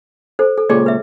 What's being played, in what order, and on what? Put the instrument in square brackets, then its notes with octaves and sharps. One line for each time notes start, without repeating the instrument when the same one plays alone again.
[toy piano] A4 C5
A4
[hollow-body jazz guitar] C#2 A#2 C#5 [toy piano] G#4 D5
[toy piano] B4 E5